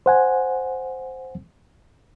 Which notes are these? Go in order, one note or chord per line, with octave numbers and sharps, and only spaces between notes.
C5 F#5 G#5